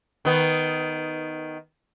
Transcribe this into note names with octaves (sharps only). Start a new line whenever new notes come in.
D#3 B3